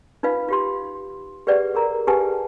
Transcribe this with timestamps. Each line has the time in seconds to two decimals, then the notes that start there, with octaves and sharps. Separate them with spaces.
0.23 D#4 F4 B4 F5
0.48 F4 G4 C6
1.47 G4 G#4 B4 D5 F#5
1.75 G#4 A#4 A#5
2.07 G4 G#4 B4 F#5 G#5 A5